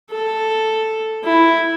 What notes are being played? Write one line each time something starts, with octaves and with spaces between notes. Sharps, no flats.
A4
E4